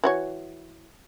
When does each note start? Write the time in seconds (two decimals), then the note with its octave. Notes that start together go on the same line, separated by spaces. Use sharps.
0.04 E3 F#4 C#5